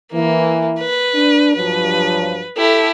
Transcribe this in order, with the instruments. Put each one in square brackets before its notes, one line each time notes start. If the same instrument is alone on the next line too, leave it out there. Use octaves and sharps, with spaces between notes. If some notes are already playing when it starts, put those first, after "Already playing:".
[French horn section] E3 [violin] A#3
[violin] B4
[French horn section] D4
[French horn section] G2 F3 F#3 [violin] B4
[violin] E4 G4 [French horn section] A4